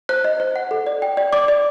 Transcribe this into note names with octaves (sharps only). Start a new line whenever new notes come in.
C5 F#6
D#5
C5
F#5
A4
D5
G5
D5
D5 D6
D5